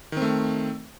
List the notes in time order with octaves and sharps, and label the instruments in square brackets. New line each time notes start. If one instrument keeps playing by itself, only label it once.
[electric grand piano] D#3
C4
A3